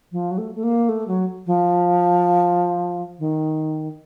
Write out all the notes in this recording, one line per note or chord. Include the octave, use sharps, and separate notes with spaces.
F3
F#3
A3
A3
A#3
A3
F#3
F3
D#3